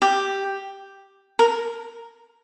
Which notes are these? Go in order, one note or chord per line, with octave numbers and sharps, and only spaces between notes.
G4
A#4